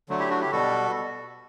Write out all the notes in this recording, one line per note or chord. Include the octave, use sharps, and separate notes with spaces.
D3 F#3 A3
E4 G4
D4 F#4
E4 G4
B2 G3 F#4 A4